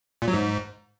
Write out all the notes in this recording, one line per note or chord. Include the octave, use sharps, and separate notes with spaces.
A#2
F#3
G#2